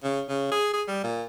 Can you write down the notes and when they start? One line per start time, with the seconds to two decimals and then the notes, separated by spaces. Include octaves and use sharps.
0.03 C#3
0.29 C#3
0.52 G#4
0.73 G#4
0.88 G3
1.04 A#2